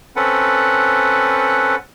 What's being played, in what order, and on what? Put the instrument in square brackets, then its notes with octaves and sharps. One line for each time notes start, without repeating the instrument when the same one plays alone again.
[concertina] C4 C#4 A4 B4 F#5